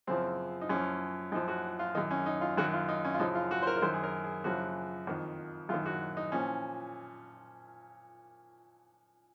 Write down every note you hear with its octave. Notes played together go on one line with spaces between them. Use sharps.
F#2 C#3 F3 C4
D#4
F#2 F3 C#4
F#2 F3 D#4
F#4
F4
F#2 D#3 D#4
C#4
D#4
F4
F#2 D#3 F#4
F4
D#4
C#4
F4
F#2 C#3 F3 D#4
F4
F#4
C5
A#4
A#4
F#2 D#3 C5
G#4
A#4
G#4
F#2 C#3 F3 F#4
F2 D#3
F#2 D#3 F4
F#4
D#4
A#2 F3 C#4